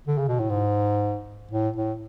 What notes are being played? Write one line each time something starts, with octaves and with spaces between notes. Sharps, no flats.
D3
C#3
B2
A2
G#2
A2
A2